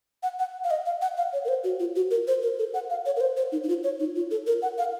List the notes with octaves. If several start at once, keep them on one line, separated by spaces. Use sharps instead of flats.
F#5
F#5
F5
D#5
F5
F#5
F5
C#5
A#4
C5
F#4
F4
F#4
A#4
C5
A#4
A4
F#5
F5
C#5
A#4
C5
C5
D#4
D#4
F4
C#5
D#4
F4
A4
A#4
F#5
F5